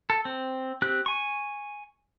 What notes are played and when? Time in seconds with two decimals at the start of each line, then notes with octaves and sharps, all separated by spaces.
0.10 A4
0.25 C4
0.82 C4 G4 F#6
1.06 G#5 C#6